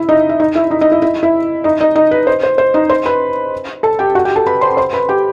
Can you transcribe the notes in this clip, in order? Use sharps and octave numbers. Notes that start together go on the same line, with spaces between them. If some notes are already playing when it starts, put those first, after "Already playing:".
Already playing: E4 E5
D#4 D#5
E5
D#4 D#5
E4 E5
D#4 D#5
D#4 D#5
E4 E5
E4 E5
E4 E5
D#4 D#5
D#4 D#5
D#4 D#5
B4
C5
C5
C5
D#4 D#5
C5 C6
B4 B5
A4 A5
G4 G5
F#4 F#5
G4 G5
A4 A5
B4 B5
C5 C6
C5 C6
B4 B5
G4 G5